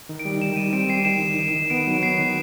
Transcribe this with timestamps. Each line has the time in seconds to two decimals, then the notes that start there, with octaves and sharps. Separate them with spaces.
0.09 D#3
0.19 D7
0.25 G3
0.41 D#3 E7
0.56 G3 D#7
0.73 C4 D7
0.89 G3 C7
1.05 D#3 E7
1.22 D#3
1.38 D#3
1.55 D#3
1.70 B3 D7
1.87 F#3
2.02 B3 C7
2.18 D#3